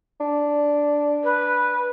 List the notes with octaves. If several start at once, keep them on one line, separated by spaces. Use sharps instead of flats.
D4
B4